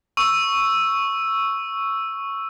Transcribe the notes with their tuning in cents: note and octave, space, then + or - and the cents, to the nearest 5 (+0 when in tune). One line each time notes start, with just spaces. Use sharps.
C#6 +0 E6 +0